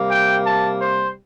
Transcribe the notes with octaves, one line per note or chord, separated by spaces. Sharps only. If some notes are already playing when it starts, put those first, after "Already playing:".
Already playing: C3 G3 A#3
G5
A5
C5